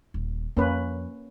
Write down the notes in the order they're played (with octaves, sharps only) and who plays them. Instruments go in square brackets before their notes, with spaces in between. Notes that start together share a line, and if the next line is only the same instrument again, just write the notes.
[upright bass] D#1
[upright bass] F2 [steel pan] A#3 C#4 B4